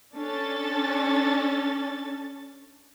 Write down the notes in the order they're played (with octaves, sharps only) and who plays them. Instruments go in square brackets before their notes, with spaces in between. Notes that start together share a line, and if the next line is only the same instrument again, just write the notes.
[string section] C#4 D4 A4 A6